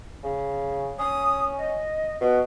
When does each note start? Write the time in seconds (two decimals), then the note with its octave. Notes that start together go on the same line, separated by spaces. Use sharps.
0.23 C#3
0.99 C#4 D#6
1.58 D#5
2.20 B2 F#4